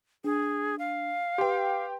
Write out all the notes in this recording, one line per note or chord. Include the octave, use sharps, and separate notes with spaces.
D4 G#4
F5
G4 B4 G5 C6